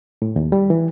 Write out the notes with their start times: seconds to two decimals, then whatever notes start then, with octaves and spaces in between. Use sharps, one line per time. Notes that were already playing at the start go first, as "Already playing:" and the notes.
0.22 A2
0.36 D#2
0.52 G3
0.70 E3